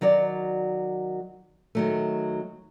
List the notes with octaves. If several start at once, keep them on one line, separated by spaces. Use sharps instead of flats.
D#3 F#3 F#4 D5
D#3 F#3 A3